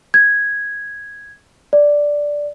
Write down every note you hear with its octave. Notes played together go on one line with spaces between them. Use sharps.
G#6
D5